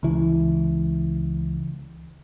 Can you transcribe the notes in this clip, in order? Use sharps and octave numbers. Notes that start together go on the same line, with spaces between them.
C#2 E3